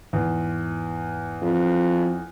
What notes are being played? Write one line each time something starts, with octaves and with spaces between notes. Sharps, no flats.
E2 G#2
F2